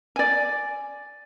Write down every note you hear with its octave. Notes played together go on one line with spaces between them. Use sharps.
D5 G#5